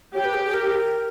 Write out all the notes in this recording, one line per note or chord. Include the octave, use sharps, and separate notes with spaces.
G4 C#5
B4
G#4
G#4
A#4